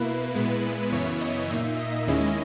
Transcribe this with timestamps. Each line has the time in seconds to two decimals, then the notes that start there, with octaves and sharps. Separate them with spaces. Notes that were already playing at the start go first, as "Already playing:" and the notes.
Already playing: B2 A#3 E4 B4
0.35 A#2 G#3 B3 E4
0.92 F#2 C#3 E3 B3 E4 C#5
1.21 D#5
1.50 A#2 A#3 D#4 E5
1.79 D#5
2.07 D#2 D#3 G#3 C#4 E4